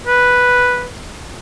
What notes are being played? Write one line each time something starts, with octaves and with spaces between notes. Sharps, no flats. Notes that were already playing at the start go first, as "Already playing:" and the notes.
B4